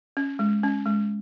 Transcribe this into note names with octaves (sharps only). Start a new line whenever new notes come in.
C#4
G#3
C#4
G#3